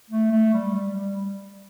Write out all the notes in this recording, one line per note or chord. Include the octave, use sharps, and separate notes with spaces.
A3
A3
G3
G3
G3